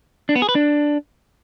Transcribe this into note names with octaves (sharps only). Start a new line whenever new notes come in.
D4
B3
G#4
B4
D4